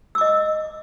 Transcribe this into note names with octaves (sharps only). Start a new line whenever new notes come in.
D#5 D6 E6